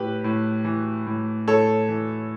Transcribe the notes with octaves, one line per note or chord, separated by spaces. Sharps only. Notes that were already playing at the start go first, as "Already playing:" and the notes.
Already playing: A2 G4 B4
A2
E3
A2
A2 A4 C#5
E3